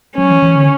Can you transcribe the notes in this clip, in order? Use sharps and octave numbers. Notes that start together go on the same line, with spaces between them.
F#3 C#4
E3
E3
D3